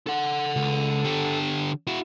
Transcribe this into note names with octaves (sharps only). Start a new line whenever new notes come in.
A4 F#5
C#2
D3 G4
E4 F#4